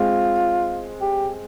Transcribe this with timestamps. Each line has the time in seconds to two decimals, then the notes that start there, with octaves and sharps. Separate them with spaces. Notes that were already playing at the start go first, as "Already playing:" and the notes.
Already playing: G#3 C4 F4
1.01 G4